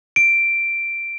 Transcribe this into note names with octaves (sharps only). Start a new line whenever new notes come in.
D7